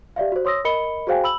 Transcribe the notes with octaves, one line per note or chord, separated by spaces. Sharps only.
G4 D5 E5 F5
F#4 C5
C#5 C6 D#6 E6 A#6
A#4 D#5 B5 C#7 G7
F#4 G#4 C5 F5 G5 G#5
B5 E6 F#7